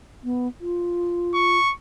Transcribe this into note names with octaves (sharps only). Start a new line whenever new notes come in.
B3
F4
C#6